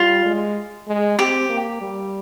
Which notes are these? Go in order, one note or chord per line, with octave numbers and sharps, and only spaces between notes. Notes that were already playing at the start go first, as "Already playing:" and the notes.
Already playing: G3 F4
G#3
G#3
C4 G4
A#3
G3